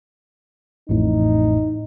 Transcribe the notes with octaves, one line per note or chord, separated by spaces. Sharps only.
A1 F2 A2 D#4